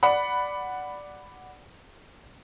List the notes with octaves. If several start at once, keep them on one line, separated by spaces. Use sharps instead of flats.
D5 F#5 B5